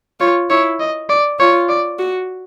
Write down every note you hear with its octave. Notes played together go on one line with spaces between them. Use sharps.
F4 C#5
E4 C#5
D#5
D5
F4 C#5
D5
F#4